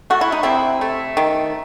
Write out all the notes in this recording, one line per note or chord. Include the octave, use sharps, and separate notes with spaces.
A3 F#4
E4
D#4
C3 C4 E4
A3
D#3